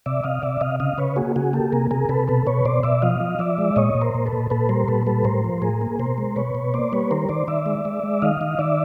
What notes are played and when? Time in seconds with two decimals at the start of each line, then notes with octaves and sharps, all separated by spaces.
0.06 C3 D5 E5
0.23 C3 D#5 F5
0.42 C3 D5 E5
0.61 C3 D#5 F5
0.80 C#3 D#5 F5
0.98 C#3 B4 C#5
1.16 A#3 F#4 G#4
1.36 C#3 F#4 G#4
1.53 A#3 G4 A4
1.72 C3 G#4 A#4
1.91 C3 G#4 A#4
2.09 C3 A4 B4
2.28 B2 A4 B4
2.46 B2 B4 C#5
2.65 B2 C5 D5
2.83 B2 D5 E5
3.02 F3 D#5 F5
3.20 F3
3.39 F3 D5 E5
3.58 G#3
3.76 A#2 C#5 D#5
3.95 A#2
4.01 A#4 C5
4.14 A#2
4.26 A4 B4
4.33 A#2
4.50 A#2 A4 B4
4.69 G3 A#4 C5
4.87 A#2 A4 B4
5.07 G3 A4 B4
5.25 A2 A#4 C5
5.44 F3
5.62 A2 G#4 A#4
5.81 A#3
5.99 B2 A#4 C5
6.18 G#3
6.36 B2 B4 C#5
6.55 B2
6.74 A#3 C5 D5
6.92 G3 B4 C#5
7.11 D#3 A#4 C5
7.29 D#3 C5 D5
7.48 D#3 D5 E5
7.66 G#3
7.85 G#3
8.04 G#3
8.22 D#3 D#5 F5
8.41 D#3
8.59 D#3 D5 E5